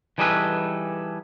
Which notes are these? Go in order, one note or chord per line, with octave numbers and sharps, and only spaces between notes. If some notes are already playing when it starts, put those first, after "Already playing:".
E3 G3 D#4 G#4 A4 B4